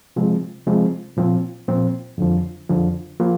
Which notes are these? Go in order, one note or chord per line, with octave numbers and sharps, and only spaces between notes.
C3 F3 G#3 C4
C3 F3 G#3 C4
A#2 F3 C4
A#2 F3 C4
F2 D3 F3
F2 D3 F3
F3 A#3 F4